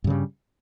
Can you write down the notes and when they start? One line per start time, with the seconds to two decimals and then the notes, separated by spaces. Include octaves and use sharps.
0.04 G2
0.07 C#3
0.10 G3